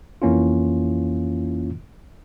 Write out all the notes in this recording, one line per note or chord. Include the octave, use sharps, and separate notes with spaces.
F2 E3 A#3 C#4 E4 F4